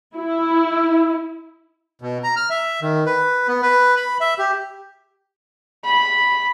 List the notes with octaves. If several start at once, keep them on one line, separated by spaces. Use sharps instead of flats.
E4
B2
A#5
F6
E5
D#3
B4
B3
B4
B5
E5
G4
B5